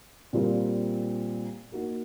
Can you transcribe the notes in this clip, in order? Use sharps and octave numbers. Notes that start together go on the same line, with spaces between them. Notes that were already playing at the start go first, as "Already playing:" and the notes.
A#2 G3 C4 F4 A#4
A#3 D#4 F#4 A#4